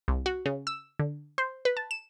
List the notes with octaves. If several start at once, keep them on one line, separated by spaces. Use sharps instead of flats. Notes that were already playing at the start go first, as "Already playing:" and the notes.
C2
F#4
C#3
E6
D3
C5
B4
A5
E7